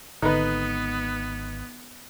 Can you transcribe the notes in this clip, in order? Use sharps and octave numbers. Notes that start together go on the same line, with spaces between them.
G#1 D3 B3 D#4 B4